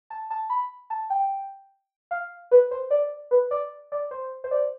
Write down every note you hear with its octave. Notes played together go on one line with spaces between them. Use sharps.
A5
A5
B5
A5
G5
F5
B4
C5
D5
B4
D5
D5
C5
C5
D5